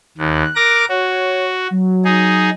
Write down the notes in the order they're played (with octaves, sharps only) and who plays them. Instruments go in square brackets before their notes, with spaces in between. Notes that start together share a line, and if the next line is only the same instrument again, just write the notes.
[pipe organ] D#2 [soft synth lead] F#6
[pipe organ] A#4 D6 A#6
[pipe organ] F#4 [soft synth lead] C#5
[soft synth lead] F#3
[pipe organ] D#4 G#4